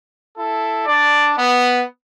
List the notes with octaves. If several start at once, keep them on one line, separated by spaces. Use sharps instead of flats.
E4 A4
D4 D5
B3